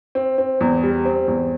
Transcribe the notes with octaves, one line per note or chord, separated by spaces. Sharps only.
C4
C4
E2
G3
C4
E2